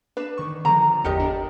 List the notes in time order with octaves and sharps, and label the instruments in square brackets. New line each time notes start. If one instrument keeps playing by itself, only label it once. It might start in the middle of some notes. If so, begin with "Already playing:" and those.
[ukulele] D4 [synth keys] B4 E7
[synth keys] D#3 C#6
[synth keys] D3 F3 [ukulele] A#5
[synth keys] G1 E2 C#7 [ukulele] G4 A#4 D#5
[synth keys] D4